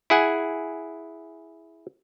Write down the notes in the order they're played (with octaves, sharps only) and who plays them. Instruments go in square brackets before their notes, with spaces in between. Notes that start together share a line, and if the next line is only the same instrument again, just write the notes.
[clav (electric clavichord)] E4 G#4 F#5 G#5